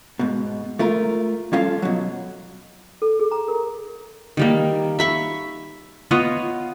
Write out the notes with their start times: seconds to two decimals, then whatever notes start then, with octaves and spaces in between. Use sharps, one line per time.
0.19 G#2 B2
0.79 A3 F4 A#4
1.53 G3 C#4 F4 A4 F5
1.82 B2 F#3
3.02 A4
3.20 G#4
3.32 A#5
3.48 A#4
4.37 D#3 G3 A#3
4.99 E5 B5 C#6
6.11 B3 F4 C#5 D#5